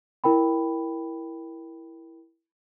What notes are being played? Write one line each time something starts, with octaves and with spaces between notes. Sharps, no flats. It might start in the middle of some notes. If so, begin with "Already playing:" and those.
E4 A#4 G5 B5